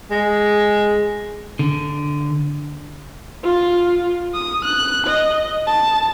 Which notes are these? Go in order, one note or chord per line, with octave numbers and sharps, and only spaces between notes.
G#3
D3
F4
D#6
F#6
D#5
A5